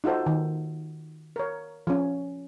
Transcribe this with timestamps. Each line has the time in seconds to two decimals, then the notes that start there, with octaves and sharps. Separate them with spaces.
0.04 D#4 F4 F#4 A4 C5
0.26 D#3
1.36 A#4 C#5
1.87 F3 C#4